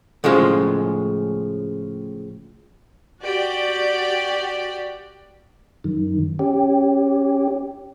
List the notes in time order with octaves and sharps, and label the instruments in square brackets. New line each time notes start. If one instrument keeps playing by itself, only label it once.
[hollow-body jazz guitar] A2 C#3 F3 G#3
[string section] F#4 G4 D5
[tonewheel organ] F#2 D#3
C#4 G4